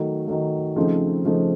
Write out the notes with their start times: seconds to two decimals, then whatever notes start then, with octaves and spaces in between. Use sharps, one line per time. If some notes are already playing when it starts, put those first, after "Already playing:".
Already playing: D#3 F#3 A3
0.27 D#3 F#3 A3
0.76 C#3 F3 A3 C4 D#4
1.25 C#3 F3 A3 C4 D#4